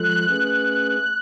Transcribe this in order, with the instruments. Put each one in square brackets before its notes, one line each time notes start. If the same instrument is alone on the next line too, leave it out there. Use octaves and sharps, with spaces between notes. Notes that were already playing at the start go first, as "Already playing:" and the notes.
Already playing: [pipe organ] F3 G#3 F4 A4 [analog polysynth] F#6
[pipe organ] A3 C#4 G#4 B4